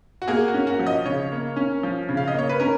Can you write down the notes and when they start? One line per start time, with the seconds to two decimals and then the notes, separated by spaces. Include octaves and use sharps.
0.22 F#4
0.28 A#3 G#4
0.48 F#4
0.54 C#4
0.67 F#4
0.79 F3
0.87 D#5
1.06 C#3 C#5
1.32 A#3
1.56 C#4
1.83 F3
2.09 C#3
2.17 F5
2.28 D#5
2.34 A#3 C#5
2.49 B4
2.60 C#4 A#4